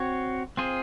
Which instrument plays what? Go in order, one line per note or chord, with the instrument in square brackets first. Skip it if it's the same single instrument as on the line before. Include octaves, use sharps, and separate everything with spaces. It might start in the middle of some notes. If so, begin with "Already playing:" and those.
Already playing: [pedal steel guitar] C4 F#4 C#5
C4 F4 G#4 C5